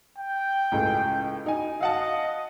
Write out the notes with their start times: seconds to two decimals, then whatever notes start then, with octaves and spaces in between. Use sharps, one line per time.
0.18 G5
0.72 C#2 A2 G#3
1.46 D#4 G#5
1.81 D#5 F5 F#5 A5